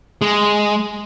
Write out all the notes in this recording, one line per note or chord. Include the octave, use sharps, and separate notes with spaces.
G#3